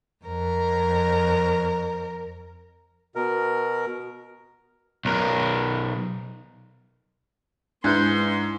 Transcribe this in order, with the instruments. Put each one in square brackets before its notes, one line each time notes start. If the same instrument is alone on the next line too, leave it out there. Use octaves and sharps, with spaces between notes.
[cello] F2 A#4
[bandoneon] B2 A#4
[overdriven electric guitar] B1 A#4
[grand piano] G#2 [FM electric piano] D4 E4 B4 [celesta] G#5 F#6 G6 [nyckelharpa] C6